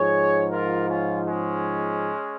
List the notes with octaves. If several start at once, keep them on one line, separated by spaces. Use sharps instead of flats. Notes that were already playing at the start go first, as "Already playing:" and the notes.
Already playing: G#2 F3 G#4 C#5
F4 A#4
C#4 F4
G#3 C#4